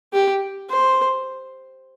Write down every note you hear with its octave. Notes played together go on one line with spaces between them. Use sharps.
G4
C5